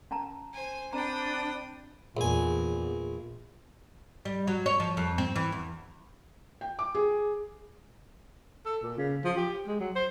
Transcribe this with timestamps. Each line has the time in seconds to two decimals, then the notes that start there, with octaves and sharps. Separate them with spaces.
0.11 C#4 A5 A#5
0.53 C5 G#5
0.93 C4 D4 C5 G5 A#5 B5 D#6
2.17 A#1 E2 G#5
4.25 G3
4.47 F#3
4.66 C#5
4.80 F3
4.97 F2
5.18 C4
5.36 E3
5.52 E2
6.61 G5
6.79 D6
6.95 G#4
8.65 A4
8.82 A#2
8.97 C#3
9.24 F3
9.37 G4
9.67 G#3
9.80 F#3
9.95 C5